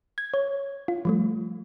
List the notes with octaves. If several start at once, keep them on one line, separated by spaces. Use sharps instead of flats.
G#6
C#5
F4
F3 G3 A3